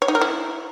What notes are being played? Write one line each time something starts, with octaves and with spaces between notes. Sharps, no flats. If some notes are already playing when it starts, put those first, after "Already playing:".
C#5
D#4
A#4
E4